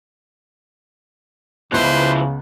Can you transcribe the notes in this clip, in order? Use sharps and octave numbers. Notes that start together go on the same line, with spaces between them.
C#2 C#3 F3 B3 E4 B4 C5 F#6